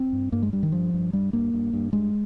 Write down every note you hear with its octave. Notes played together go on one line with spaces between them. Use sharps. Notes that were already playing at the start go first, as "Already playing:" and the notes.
Already playing: C4
G2
G2 A#3
G#3
G2 G3
D#3
G2 F3
G2
G2 G3
G2 A#3
G2
G2
G2 G#3